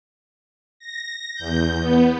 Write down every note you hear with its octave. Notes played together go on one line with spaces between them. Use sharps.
A#6
E2 G6
B3